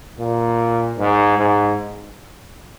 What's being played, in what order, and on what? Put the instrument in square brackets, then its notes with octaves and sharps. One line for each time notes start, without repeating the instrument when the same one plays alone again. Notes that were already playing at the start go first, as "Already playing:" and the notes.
[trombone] A#2
G#2
G#2